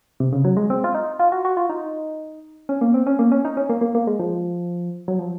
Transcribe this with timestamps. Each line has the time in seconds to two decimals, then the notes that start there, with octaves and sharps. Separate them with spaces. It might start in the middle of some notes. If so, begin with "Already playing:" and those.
0.20 C3
0.33 C#3
0.45 F#3
0.57 G#3
0.70 C4
0.84 F4
0.94 D#4
1.19 F4
1.32 F#4
1.45 F#4
1.57 F4
1.69 D#4
2.69 C#4
2.81 A#3
2.94 C4
3.07 C#4
3.19 A#3
3.32 C#4
3.45 D#4
3.57 C#4
3.69 A#3
3.81 A#3
3.95 A#3
4.07 G#3
4.19 F3
5.08 F#3
5.19 F3